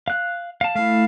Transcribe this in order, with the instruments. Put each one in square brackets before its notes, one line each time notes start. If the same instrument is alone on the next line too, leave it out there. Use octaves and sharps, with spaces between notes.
[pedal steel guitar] F5 F#6
F5 A5
[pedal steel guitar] A3 E4 [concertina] F5